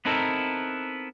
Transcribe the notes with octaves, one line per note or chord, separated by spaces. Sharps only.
B3 C4 D#4 E4 A4 A#4